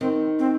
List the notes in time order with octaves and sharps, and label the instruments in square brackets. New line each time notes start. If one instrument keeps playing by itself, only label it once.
[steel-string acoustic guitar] D#3 [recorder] C4
[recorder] C4